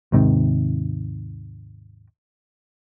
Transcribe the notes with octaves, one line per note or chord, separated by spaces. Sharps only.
D#2 G#2 C3 D#3